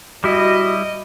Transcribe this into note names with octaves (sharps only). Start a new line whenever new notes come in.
G3 E4 F#4 D#5